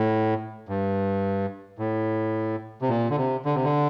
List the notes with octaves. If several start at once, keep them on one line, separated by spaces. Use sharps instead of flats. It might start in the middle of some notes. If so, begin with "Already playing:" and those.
Already playing: A2
G2
A2
C3
A#2
D3
C3
D3
C3
D3